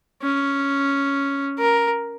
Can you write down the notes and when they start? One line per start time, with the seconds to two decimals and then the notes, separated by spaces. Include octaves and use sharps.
0.22 C#4
1.59 A#4